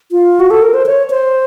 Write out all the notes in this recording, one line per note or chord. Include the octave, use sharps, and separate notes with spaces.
F4
F#4
A4
A#4
C5
C#5
C5